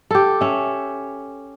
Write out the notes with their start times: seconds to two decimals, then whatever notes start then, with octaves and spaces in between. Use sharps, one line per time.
0.11 G4 A4
0.41 C#4 E5